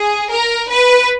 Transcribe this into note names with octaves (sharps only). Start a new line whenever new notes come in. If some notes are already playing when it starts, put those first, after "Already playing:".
Already playing: G#4
A#4
B4